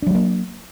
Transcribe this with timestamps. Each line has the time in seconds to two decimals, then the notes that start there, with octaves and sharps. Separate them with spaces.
0.02 D4
0.06 F#3
0.11 G3
0.15 A#3